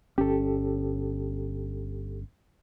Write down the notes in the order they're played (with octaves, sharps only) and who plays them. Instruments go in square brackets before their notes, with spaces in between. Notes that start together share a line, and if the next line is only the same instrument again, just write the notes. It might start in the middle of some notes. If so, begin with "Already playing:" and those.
[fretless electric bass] G1 C#4 [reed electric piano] G4 A4